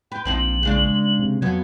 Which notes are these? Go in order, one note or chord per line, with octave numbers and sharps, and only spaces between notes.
B4 G5
A#1 F3 C4 D#4 F#7
C#3 G#3 D4
C3
F2 F#3 B3 G#6